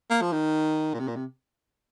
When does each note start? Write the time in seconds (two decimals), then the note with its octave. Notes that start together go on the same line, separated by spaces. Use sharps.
0.10 A#3
0.22 F3
0.33 D#3
0.94 A#2
1.00 C3
1.08 A#2
1.16 C3